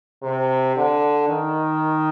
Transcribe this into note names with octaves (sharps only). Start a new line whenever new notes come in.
C3
D3
D#3